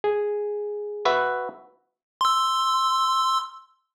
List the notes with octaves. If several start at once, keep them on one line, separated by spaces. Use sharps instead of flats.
G#4
F#4 B4 E5
C6 E6